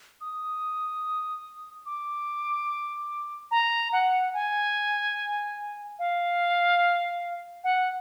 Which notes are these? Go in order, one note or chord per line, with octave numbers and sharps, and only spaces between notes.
D#6
D6
A#5
F#5
G#5
F5
F#5